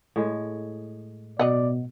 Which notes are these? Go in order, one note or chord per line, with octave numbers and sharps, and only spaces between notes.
A2 G#3
B2 F#3 D5 D#5 F#5